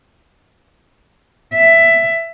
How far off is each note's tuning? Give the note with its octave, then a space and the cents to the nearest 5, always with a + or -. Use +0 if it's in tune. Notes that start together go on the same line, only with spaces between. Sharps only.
E5 +10